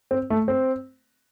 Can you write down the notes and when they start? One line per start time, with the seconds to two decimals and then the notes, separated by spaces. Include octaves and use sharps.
0.11 C4
0.30 A3
0.48 C4